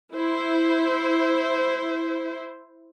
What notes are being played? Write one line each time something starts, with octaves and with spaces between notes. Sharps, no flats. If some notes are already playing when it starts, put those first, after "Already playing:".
E4 C5